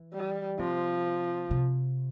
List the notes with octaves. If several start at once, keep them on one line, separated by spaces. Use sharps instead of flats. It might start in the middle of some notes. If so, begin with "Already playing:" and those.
Already playing: E3
G3
C3 F3
C3